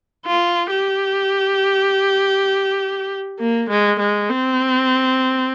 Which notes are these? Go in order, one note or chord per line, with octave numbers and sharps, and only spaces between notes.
F4
G4
A#3
G#3
G#3
C4